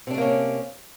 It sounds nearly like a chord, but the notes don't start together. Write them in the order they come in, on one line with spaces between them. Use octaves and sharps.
C3 D4 A3 A#3 C#4